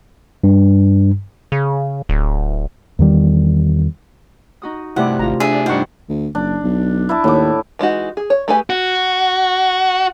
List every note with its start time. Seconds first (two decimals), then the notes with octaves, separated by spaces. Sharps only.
0.44 G2
1.52 C#3
2.09 D1
2.99 E2 D#3 G3
4.62 D#4 F#4 D#6
4.96 G2 C3 A3 E4 D5 F#5
5.19 G#1 F4 A#5
5.40 D4 G#4 E5
5.66 G2 D#4 F4 C5 F#5 C#6
6.09 D2
6.35 F#1 D4
6.63 B1
7.09 E4 D5 A5
7.24 D#2 A2 D6
7.79 E3 G#3 D#4 F#4
8.17 G#4
8.30 C#5
8.48 A3 G4 G#4 B4 G#5
8.70 F#4